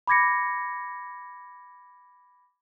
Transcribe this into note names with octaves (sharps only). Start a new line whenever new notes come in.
B5 D6 G#6 A#6 C#7